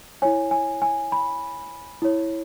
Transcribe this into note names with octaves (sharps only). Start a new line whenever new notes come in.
E4 C#5 G#5
G#5
G#5
B5
E4 C#5